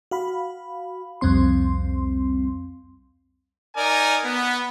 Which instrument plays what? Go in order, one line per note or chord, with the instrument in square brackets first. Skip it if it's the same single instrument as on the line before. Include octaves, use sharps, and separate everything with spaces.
[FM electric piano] F#4 F5 B5
C2 F2 G3 C4 C6
[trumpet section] D#4 A#4 D5 G#5
B3